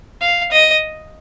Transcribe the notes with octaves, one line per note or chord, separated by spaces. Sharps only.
F5
D#5